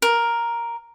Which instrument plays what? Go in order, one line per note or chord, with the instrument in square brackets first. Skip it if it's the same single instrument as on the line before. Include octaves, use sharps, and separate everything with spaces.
[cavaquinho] A#4